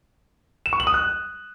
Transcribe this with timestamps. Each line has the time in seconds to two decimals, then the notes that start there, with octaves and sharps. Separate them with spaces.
0.66 E7
0.73 C#6
0.80 F#7
0.87 D#6
0.94 F#6